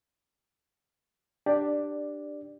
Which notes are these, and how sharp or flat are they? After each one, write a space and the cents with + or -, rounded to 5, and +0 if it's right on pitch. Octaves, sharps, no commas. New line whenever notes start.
D4 +10 G4 +5 D5 +0